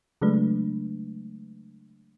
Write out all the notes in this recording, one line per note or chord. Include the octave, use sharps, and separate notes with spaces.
C#3 F#3 G#3 A3 D4 B4